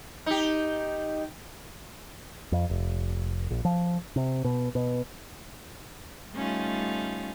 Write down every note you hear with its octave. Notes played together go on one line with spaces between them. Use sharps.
D#4 G4
F2
F1
A#1
F3
C3
B2
B2
G3 A3 C#4 D#4 F4